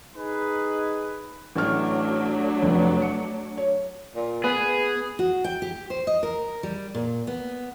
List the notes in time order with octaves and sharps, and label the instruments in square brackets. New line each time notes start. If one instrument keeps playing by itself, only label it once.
[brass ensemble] D#4 G#4 B4
[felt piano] A1 F6 [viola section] F#3 A3 D4
[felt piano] F1
C#7
C#5
[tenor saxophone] A#2
[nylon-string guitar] B3 [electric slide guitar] G#4 [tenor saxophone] B4
[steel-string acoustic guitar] F#4
G5
G4
C5
D#5
A#4
G3
A#2
B3